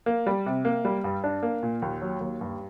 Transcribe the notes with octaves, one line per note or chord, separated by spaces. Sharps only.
A#3
G3
C3
A#3
G3
G2
D4
A#3
A#2
D#2
F#3
D#2
G2